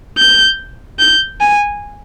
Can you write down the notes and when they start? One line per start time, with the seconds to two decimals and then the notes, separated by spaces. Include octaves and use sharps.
0.17 G6
0.99 G6
1.41 G#5